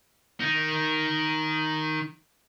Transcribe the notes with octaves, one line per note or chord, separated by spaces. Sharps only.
D#3 D#4